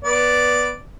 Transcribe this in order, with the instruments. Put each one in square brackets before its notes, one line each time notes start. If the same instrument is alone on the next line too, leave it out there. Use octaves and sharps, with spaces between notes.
[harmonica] B3 D5